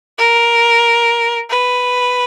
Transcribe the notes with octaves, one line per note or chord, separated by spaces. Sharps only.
A#4
B4